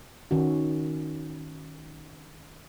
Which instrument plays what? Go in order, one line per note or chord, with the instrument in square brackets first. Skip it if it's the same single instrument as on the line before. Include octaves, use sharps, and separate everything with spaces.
[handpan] D#3 C#4 F#4